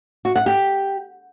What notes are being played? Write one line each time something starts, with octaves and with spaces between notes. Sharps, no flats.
F#4
F#5
G4